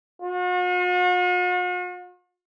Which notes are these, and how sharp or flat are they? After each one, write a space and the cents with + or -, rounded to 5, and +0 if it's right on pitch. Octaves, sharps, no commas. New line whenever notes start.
F#4 -45